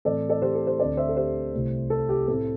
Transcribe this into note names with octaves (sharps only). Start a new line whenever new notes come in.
A2 E3 C4 A4 D5
A4 D5
G4 C5
A4
G4 C5
D2 D3 C4 A4 D5
C5 E5
A4
G4 C5
C2 C3 A3 C4
A4
G4
A2 A3 C4 A4